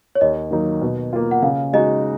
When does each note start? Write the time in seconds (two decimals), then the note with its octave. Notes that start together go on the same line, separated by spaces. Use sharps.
0.15 C#5
0.21 D#2 D#5
0.51 D#3 F#3 A#3 D#4
0.82 B2
1.13 A#3 F4
1.31 F#5
1.42 C#3 F5
1.73 G#3 D#4 F#4 D#5